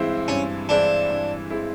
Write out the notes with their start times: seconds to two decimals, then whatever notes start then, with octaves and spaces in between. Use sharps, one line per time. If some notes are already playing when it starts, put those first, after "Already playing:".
Already playing: G2 E3 G#3 C4 E4
0.28 G2 C#4
0.69 E3 G#3 C4 D4 E4
1.10 G2
1.50 E3 G#3 C4 E4